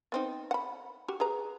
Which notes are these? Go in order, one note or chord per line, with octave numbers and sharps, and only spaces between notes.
B3 C4 D#4
F#5 B5
F#4 G4
G#4 B4 A#5